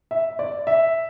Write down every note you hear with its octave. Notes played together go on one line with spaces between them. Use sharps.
E5
D5
E5